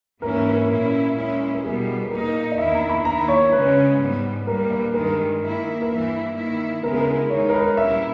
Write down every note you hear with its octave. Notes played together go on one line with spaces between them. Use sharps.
G#2 E3 A#3 C#4 E4 A#4
B4
A#4
A#2 A#3 C#4 E4
A#2 G#3 C#4 E4
A#4
B2 G3 B3 G#4
B4
A#2 A#3 D#4 A#4
D#5
E2 D#3 A#3 E4 E5
A#5
B5
D#3 A#3 E4 A#5
C#5
C#3 G#3 C#4 B4
G#2 G3 B3
A#2 G3 A#3 A#4
B4
G2 D#3 G#3 A#4
D#3 A#3 E4
A#4
G2 E3 A#3 E4 B4
D#3 A#3 E4
C#3 G#3 B3 E4 A#4
G#4
A#4
D#3 G#3 D#4 C#5
A#4
B4
A#2 G3 C#4 E4 E5